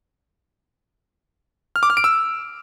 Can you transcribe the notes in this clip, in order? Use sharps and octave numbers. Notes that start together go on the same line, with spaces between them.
F6
D6
F6
D7
E6